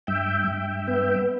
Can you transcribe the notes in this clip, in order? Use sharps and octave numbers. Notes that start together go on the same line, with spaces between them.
G2 E5 G5
G2
B3